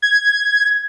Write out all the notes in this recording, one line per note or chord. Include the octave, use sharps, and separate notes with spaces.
G#6